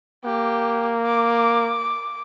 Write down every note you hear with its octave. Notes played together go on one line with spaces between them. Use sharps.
A#3 G4
D6